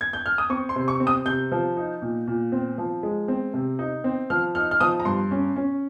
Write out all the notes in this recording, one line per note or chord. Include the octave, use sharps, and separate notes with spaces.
G#6
G6
F6
D#6
C4 C#6
C6
C3
C#6
C4
D#6
C3 G6
F3
D#4
A#2
A#2
C4
F3
G#3
C4
C3
D#4
C4
F3 F6
D#4 F6
F6
F3 D#6
A#5
G2 C6
C#4
C#4